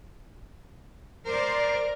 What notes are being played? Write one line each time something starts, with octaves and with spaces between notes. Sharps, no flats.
A#4 C5 D5